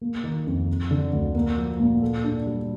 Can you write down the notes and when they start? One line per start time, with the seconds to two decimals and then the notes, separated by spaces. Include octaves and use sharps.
0.01 A#3
0.24 D#3
0.47 F2
0.69 F3
0.91 D3
1.13 D2
1.35 A#3
1.57 F3
1.80 A#2
2.02 A4
2.24 D4
2.46 G3